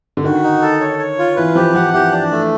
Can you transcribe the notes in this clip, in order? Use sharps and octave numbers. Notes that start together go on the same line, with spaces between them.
D3
D#3 F#4
D#4
A4
C#5
C#5
F4
E3 B4
F3 G4
F3 F#5
E3 G4
D4
A3